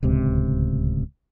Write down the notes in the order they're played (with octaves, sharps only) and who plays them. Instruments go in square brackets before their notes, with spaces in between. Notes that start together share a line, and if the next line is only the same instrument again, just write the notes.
[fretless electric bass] D1 C#2 C3